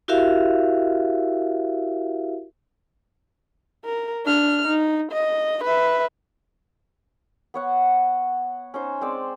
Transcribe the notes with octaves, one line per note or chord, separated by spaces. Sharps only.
E4 F#4 G4 A#4 E5 F5
A#4
D4 F6
D#4
D#5
B4 E5
B3 C#5 F#5
C#4 D#4 C5
G#3 C4 C5 D5